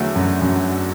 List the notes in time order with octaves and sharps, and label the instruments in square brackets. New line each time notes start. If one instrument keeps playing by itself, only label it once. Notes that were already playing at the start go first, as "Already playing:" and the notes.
Already playing: [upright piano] E2 D3 F#3 A3
[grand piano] F#2
F#2